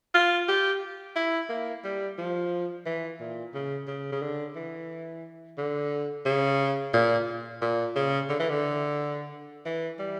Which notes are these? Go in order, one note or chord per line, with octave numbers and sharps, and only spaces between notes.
F4
G4
E4
A#3
G3
F3
E3
A#2
C#3
C#3
C#3
D3
E3
D3
C#3
A#2
A#2
C#3
D3
E3
D3
E3
G3